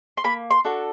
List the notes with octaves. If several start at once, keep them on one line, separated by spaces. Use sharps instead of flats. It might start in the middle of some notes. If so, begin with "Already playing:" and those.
C6
A#3 B5
C6
D4 F#4 A4